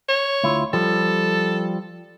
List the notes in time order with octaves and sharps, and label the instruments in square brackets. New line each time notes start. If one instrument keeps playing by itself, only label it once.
[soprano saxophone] C#5
[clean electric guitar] D2 E4 F4
[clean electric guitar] F3 G3 [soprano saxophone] A4